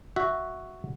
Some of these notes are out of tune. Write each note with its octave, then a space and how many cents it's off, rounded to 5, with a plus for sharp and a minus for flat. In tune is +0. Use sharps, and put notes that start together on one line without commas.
F#4 +0 E5 +0